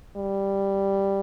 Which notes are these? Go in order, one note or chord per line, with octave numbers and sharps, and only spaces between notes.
G3